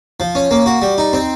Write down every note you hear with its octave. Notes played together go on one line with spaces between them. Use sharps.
F3
C#4
A#3
F#4
G3
D#4
C4